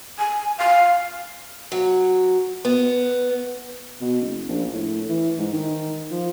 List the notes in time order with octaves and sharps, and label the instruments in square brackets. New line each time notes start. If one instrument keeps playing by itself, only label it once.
[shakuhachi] G#5
F5
[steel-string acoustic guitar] F#3
B3
[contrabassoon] B2
F#1
A#1
A2
E3
G#2
D#3
F3